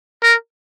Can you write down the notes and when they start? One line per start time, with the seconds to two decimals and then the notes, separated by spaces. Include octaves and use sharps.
0.23 A#4